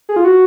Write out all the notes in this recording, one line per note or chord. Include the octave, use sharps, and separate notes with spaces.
G#4
F4
F#4